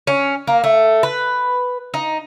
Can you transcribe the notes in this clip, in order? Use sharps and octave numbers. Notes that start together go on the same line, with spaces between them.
C#4
A#3
A3
B4
D#4